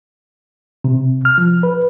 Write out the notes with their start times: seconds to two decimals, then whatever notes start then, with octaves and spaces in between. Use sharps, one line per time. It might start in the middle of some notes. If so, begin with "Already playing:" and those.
0.84 C3
1.25 F6
1.38 F3
1.63 B4